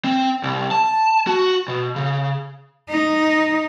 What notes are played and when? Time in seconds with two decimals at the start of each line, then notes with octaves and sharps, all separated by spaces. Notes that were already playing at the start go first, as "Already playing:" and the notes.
0.04 C4
0.43 C2
0.71 A5
1.27 F#4
1.68 B2
1.96 C#3
2.90 D#4